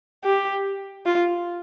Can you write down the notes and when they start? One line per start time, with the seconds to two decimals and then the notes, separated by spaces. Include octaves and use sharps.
0.24 G4
1.06 F4